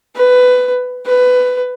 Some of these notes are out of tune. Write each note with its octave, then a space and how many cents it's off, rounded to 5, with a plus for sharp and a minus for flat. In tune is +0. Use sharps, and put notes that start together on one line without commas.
B4 +15
B4 +15